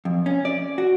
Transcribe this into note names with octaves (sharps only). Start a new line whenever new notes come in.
F2
C#4
D5
F#4